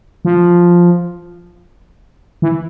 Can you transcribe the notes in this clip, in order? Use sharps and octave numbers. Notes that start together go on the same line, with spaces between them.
F3
E3